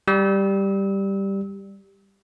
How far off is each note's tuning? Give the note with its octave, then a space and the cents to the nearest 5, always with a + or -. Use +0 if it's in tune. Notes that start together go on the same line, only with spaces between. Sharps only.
G3 +0 E6 -35